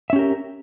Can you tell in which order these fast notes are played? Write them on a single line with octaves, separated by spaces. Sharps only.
E5 C#4 G4 A#4